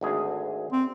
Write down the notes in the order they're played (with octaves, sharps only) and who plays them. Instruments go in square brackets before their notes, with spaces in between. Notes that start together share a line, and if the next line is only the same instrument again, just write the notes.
[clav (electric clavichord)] G#1 D2 G#4
[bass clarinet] C4